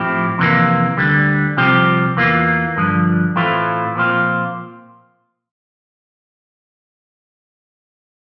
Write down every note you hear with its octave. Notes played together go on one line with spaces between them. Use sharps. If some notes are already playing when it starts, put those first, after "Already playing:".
Already playing: A2 F3 C4 E4 G4
F2 C3 E3 A#3
D2 D3 G3
C2 C3 F3 C4 G4
E2 E3 A#3 F4
G2 D3 F3
A2 E3 A3 C4 F4
A#2 F3 C4 F4